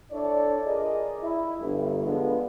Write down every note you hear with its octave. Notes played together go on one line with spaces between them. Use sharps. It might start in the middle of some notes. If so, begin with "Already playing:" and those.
D4 E4 A4 C#5 D5
F4 G#4 A#4 D5 D#5
E4
G1
D3 F3 G#3 B3